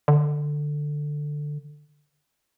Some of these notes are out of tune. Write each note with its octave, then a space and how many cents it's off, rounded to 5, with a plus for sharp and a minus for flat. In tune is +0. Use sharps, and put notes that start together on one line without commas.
D3 +10